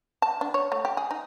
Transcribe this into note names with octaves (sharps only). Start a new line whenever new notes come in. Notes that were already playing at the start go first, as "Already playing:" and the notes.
A5
D4
C#5
A3
G4
G#4
D#4